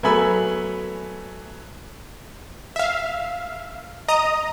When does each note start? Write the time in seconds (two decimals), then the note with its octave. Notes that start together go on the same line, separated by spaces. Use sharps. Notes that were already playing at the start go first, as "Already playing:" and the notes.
0.03 F#3 A3 B3 G#5 B5 E6
2.76 E5 F5
4.08 D#5 A#5 D#6